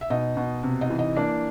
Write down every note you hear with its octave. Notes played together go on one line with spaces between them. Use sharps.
E5
B2 D#4 D#5
B2
C3
D#4 D#5
E3
D#4 D#5
A#3 D4 D5